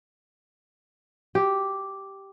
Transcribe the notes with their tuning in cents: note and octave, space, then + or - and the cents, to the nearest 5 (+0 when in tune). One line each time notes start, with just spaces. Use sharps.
G4 -5